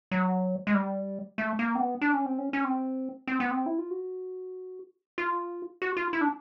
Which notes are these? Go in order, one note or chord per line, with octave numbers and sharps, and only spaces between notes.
F#3
G#3
G3
A3
A#3
C4
B3
D4
C#4
C4
C#4
C#4
C4
C4
B3
C4
E4
F4
F#4
F4
F#4
F4
E4
D4